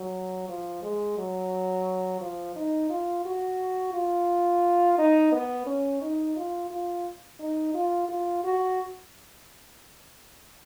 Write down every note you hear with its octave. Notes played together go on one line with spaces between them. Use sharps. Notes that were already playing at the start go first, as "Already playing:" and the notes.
Already playing: F#3
F3
G#3
F#3
F3
D#4
F4
F#4
F4
D#4
B3
C#4
D#4
F4
F4
D#4
F4
F4
F#4